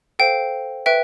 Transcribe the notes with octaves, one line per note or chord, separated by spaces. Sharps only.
A4 C5 F5 G5
B4 E5 G5